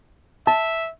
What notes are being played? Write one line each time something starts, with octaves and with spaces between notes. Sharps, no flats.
E5 A5